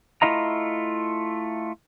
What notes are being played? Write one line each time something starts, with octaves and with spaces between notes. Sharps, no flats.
A3 E4 F4 D#5 A#5